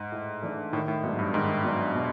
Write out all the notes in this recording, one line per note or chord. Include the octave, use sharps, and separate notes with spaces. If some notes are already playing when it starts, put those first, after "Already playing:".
Already playing: G#2
A2
E3 A3 D4
A2 D#3
A2
G#2 F#3 B3 D4
G2
G#2 D#3
F#3 B3 D4
B2